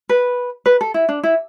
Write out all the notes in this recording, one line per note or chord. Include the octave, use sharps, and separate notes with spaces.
B4
B4
A4
E4
D4
E4